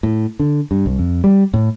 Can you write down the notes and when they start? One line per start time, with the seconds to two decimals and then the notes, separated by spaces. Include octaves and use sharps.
0.03 A2
0.40 D3
0.71 G2
0.86 C2
0.99 F2
1.24 G3
1.54 A2